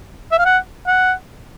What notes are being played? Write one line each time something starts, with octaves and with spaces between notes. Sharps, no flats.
E5
F5
F#5
F#5